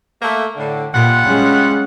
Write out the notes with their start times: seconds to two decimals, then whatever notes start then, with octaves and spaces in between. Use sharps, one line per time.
0.22 A3 A#3
0.57 A2 D3
0.94 A#2 G3 F4 F#5
1.25 G#3 C#4